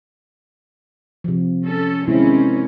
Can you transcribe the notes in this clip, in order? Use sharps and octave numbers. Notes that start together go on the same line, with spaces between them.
C3 F3
C#4 A4
C3 D#3 G#3 C4 C#4 E4